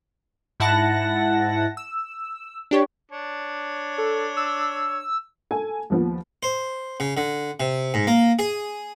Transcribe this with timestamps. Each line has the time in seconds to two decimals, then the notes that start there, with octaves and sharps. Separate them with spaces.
0.60 G#2 E4 F#5 A5 A#6
1.77 E6
2.71 D4 G4 C#5
3.11 D4 C#5
3.98 A4
4.37 E6
5.51 A4 G#5
5.90 D#2 F3 B3
6.43 C5
7.00 C#3
7.17 D3
7.60 C3
7.94 G#2
8.07 A#3
8.39 G#4